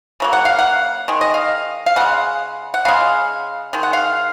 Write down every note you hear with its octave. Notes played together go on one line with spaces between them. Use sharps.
C#3 F#3 A#3
F#5
F5
F#5
D#3 G#3
D#5
F5
F5
C#3 G#3 F#5
F#5
C#3 G#3 F5
D#3 G#3
F#5
F5